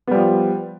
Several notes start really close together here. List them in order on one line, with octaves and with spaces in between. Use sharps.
B3 G3 F3